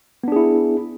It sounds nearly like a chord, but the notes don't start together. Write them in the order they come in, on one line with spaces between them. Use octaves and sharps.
B3 D4 G#4 E4